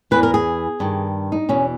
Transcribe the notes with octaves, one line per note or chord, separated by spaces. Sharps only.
E2 C#3 E3 B4
A#4
G#4
G2 D#3
D#4
E2 B2 C#4